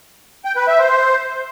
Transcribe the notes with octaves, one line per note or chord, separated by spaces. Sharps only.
G5
B4
E5
C5